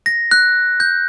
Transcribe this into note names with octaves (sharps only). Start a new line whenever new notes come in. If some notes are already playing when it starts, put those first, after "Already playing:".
A#6
F#6
G6